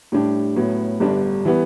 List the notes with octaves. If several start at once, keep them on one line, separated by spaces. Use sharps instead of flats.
A2 G3 D4 G4
A2 F#3 B3
G1 G2 D3 G3 D4
E3 G3 B3